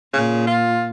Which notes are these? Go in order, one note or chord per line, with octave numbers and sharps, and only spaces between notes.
A#2 C#3
F4